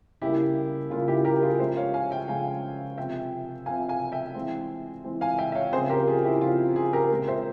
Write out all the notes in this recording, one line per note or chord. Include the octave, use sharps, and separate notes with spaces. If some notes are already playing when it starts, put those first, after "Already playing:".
C#3 G3 A#3 E4 G4
C#3 G3 A#3 F4
E4 G4
G4 A#4
F4 G#4
C#3 F3 G#3 C5 E5
C#5 F5
F5 G#5
E5 G5
C#3 F3 G#3 F5 G#5
C3 F3 C4 E5 G5
C3 F3 C4 F5 G#5
F5 G#5
E5 G5
E3 G#3 C4
E3 G#3 C4
F5 G#5
E5 G5
E5
C#5 F5
C#3 F3 C4 G#4 C5
G4 A#4
F4 G#4
E4 G4
C#3 F3 C4 F4
F4 G#4
G4 A#4
A#2 G#3 C4
C5 E5